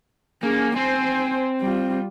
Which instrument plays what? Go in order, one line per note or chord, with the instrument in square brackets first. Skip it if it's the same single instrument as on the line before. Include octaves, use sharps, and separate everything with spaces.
[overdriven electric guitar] A#3 [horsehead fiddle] C#4 G#4
[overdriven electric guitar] C4 [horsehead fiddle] C5 G#5
[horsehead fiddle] G3 F4